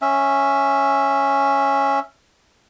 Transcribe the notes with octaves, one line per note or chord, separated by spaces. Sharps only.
C#4 E5